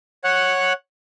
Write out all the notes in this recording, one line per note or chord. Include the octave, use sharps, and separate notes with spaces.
C#5 F#5 F#6